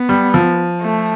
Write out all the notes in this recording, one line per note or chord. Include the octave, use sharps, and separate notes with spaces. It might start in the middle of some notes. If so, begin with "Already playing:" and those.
Already playing: B3
G3
F3
A3